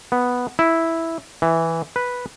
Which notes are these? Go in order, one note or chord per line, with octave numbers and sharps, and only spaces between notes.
B3
E4
E3
B4